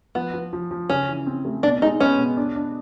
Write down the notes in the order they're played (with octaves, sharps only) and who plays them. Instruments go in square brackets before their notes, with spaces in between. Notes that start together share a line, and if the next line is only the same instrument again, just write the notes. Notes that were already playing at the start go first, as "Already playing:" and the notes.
[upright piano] F3 [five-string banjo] B3
[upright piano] F3
F3
F3
[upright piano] C#3 [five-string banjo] C#4
[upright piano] E3
C4
A3
[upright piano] B2 [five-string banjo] D4
[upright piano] G#3 [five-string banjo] D#4
[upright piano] B3 [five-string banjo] C#4
[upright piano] B2
D4
D4